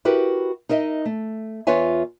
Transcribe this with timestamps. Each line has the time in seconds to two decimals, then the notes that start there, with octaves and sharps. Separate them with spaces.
0.05 E4 F#4 G4 A#4 B4
0.69 D#4 A#4 D#5 E5
1.05 A3
1.67 E2 F4 B4 C#5 E5 G#5